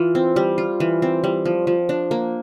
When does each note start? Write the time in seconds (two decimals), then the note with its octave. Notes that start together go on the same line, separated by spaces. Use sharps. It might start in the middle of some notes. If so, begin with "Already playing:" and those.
Already playing: E3 F4
0.15 C4
0.36 G3
0.58 F4
0.80 E3
1.02 C4
1.24 G3
1.45 F3
1.67 F3
1.89 D4
2.11 A#3